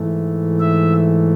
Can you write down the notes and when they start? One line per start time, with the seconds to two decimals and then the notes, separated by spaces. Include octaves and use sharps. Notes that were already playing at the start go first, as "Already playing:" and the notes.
Already playing: G#2 E3 A3
0.60 E5